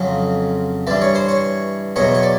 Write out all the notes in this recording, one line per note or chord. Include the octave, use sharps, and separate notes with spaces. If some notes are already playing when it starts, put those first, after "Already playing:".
Already playing: F2 C#3 F#3
G2 E3 D5
C#5
C5
C#5
E2 B2 F#3 C#5
C#5
D5